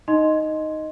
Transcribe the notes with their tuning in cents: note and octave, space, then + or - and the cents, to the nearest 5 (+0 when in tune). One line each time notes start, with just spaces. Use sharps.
D#4 +0 D#5 +0 C6 +0